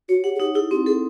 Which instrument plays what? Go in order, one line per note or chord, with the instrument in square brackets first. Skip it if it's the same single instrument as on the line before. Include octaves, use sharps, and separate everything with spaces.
[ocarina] F#4 [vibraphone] C#5
[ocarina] G4 [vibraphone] F#5
[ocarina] G#4
[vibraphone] D#4 [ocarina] G4
[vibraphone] E4 [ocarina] G#4
[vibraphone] C4 [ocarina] G4
[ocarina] G#4 [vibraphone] A4